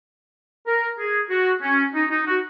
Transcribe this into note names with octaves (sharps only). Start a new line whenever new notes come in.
A#4
G#4
F#4
C#4
D#4
D#4
F#4